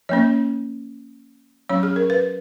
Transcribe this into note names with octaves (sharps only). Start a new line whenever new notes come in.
F3 A#3 C#4 C#5
F#3 C#4 C#5
G#4
A#4
B4